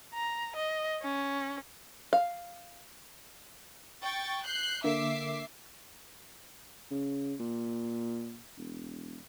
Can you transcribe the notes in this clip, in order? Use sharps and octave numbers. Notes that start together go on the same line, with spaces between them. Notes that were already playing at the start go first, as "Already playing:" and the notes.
A#5
D#5
C#4
F5
G5 C#6 A6
F#6 G6 C7
D3 A#3 E5 D6 C7
C#3
A#2
E1